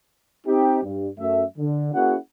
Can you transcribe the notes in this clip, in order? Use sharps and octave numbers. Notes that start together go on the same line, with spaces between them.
C4 D#4 G4
G2
F#2 A3 E5
D3
A#3 C#4 E4 F#4 G#4 F#5